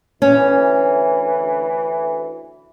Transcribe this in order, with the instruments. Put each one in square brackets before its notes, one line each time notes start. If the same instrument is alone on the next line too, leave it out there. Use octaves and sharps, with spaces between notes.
[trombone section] D2 E3 [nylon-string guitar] C#4